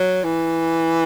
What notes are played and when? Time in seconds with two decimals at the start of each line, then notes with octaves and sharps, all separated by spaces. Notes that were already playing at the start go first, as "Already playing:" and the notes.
Already playing: F#3
0.24 E3